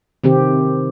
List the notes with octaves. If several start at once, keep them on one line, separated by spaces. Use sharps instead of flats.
C3 D#3 C4 G4